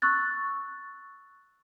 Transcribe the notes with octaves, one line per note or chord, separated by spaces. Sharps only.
C#6 E6 F#6 A6